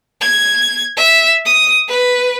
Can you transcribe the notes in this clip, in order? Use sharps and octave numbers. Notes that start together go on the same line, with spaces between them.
G#6
E5
D#6
B4